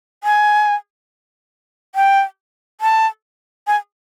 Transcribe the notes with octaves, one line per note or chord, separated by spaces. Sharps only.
G#5
G5
A5
G#5